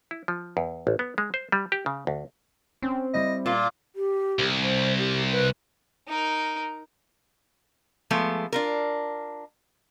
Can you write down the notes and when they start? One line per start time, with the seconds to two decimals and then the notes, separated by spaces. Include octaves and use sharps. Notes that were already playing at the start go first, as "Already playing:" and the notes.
0.11 E4
0.28 F3
0.57 E2
0.87 A1
0.99 B3
1.18 G#3
1.34 C5
1.52 G3
1.72 G4
1.86 C#3
2.07 D2
2.82 C4 C#4
3.13 G3 E4 D#5
3.46 A#2 F4
3.96 G4
4.39 C2
4.62 C5
4.98 G4
5.31 B4
6.08 D#4 A#4
8.11 F3 G#3 A3 B3
8.53 D4 F4 A#4